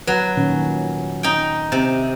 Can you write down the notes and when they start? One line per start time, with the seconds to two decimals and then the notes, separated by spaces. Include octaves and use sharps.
0.07 F#3 B4
0.37 A#2 D#3 C#4
1.23 D#4 G5
1.72 C3